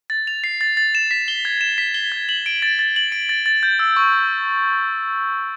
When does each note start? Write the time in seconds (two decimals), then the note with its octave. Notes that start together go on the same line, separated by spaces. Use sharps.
0.10 A6
0.27 F7
0.44 C7
0.61 A6
0.77 A6
0.95 E7
1.11 B6
1.28 G7
1.45 G#6
1.61 E7
1.78 B6
1.94 G7
2.12 G#6
2.29 F#7
2.46 D7
2.62 A6
2.79 A6
2.96 F#7
3.12 D7
3.29 A6
3.46 A6
3.63 G6
3.79 E6
3.97 C#6